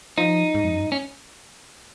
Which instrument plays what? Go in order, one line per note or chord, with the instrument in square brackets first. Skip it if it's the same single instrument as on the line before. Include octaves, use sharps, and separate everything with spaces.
[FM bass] F3 [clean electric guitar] D#4
[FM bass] G#2
F2
F#2
G#2
[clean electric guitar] C#4